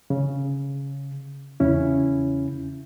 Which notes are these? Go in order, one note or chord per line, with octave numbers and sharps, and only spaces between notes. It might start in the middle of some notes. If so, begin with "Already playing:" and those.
C#3
E2 C#3 C#4 E4